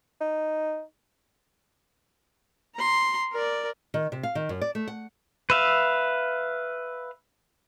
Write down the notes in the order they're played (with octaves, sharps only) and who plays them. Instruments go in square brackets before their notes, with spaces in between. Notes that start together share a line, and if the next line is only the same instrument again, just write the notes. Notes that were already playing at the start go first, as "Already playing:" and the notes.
[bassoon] D#4
[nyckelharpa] A#5 C6
A#4 D5
[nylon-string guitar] D#3
C3
F5
D#3
F#2
D5
A3
F#5
[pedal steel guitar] B4 E5 F5